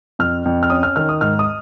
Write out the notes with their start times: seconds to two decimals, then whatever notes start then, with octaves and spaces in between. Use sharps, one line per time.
0.19 F2 F6
0.45 F2
0.63 F6
0.70 C#4 D#6
0.83 F6
0.96 D#3 F6
1.09 D#6
1.21 G#2 F6
1.39 D#6